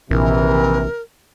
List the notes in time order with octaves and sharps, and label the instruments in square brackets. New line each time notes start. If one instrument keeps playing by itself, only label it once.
[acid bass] A#1 [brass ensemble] C3 D#3 E3 [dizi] A#4